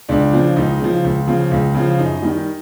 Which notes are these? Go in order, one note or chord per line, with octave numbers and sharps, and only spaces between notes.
C#2 D4
C#3 F3
C#2 D#4
C#3 F3
C#2
C#3 F3
C#2
C#3 F3
F#2 D#4
D#3 G3